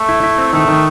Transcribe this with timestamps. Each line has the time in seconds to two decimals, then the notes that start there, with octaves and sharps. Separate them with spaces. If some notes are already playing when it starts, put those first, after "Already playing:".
Already playing: A3
0.09 E4
0.23 E4
0.38 C4
0.53 D#3 A3
0.68 D#3